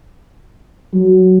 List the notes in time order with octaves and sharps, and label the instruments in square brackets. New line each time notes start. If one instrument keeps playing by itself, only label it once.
[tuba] F#3